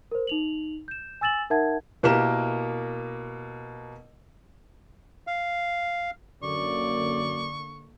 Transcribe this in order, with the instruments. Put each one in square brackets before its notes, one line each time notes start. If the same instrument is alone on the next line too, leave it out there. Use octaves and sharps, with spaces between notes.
[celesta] A#4 C5
D#4 F7 F#7
G6 E7
G#5 E6 A6 E7 F#7
D#4 A#4 E5 F#5 A5 G#6
[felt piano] B2 A#3 E4 G4 A#4 E7
[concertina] F5
[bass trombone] F#2 [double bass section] D3 A#3 [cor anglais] D5 [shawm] C#6